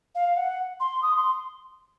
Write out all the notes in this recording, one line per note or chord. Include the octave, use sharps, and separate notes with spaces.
F5
F#5
C6
D#6
C6